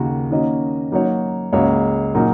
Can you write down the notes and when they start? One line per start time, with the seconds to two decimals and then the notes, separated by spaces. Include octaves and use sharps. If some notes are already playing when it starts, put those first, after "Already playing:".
Already playing: D#2 C#3 A#3 F#4
0.31 D#3 A#3 C#4 F#4 D#5
0.92 F#3 A#3 D#4 F#4 C#5
1.53 C#2 C#3 A#3 F#4 C#5
2.14 A#2 F#3 D#4 F#4 A#4